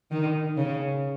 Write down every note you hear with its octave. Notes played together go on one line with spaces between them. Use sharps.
D#3
C#3